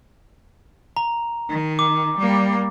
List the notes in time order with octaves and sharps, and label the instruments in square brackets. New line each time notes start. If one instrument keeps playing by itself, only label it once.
[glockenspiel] A#5
[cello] D#3
[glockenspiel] D6
[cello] G3 A#3